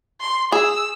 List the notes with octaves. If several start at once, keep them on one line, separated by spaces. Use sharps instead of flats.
C6
G#4 E6